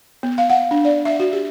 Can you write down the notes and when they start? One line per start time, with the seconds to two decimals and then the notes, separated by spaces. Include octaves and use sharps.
0.23 B3
0.38 F5
0.50 F#5
0.71 D4
0.85 D5
1.05 E5
1.20 F#4
1.33 G4